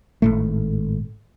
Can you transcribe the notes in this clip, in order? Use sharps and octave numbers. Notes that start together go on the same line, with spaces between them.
G#1 A2 A3